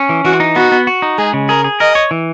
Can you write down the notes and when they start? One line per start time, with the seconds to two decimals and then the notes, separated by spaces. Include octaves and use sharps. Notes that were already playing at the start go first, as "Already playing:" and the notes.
Already playing: C#4
0.09 E3
0.25 E3 F#4
0.40 D#4
0.56 B3 F#4
0.72 B3
0.87 F#4
1.02 D#4
1.18 G#3 G#4
1.33 C#3
1.49 G#4 A#4
1.64 G#4
1.80 A#4 D#5
1.95 C#5
2.11 E3